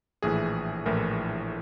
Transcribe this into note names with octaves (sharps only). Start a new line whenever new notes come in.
A#1 A2 E3 G#4
A#1 A2 E3 A#4